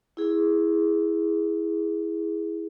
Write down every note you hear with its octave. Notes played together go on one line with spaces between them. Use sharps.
E4 G#4